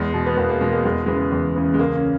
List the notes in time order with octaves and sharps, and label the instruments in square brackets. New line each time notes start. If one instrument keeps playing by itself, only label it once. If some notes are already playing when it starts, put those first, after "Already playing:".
Already playing: [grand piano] E2 G#3
B2
B3
E2 A#3
A#3
B2 G#3
A#3
E2 G#3
C#3 E3 G#3
E2
C#3 E3
G#3
C#2 A#3
C#4